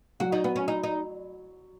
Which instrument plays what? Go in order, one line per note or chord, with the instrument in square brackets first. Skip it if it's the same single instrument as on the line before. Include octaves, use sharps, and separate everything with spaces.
[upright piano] F#3 [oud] F#4
[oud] D#4
B3
C#4
D#4
D#4